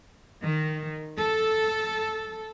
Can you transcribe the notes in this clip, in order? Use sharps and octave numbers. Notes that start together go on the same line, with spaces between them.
D#3
A4